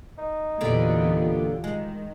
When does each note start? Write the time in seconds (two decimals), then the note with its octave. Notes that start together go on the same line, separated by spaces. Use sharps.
0.18 D#4
0.61 E2 A#2 D3 F#3 B3 F4 G4
1.64 D#3 G#3